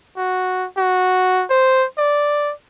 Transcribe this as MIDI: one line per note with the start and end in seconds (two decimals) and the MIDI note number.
0.17 0.67 66
0.78 1.44 66
1.50 1.85 72
1.98 2.52 74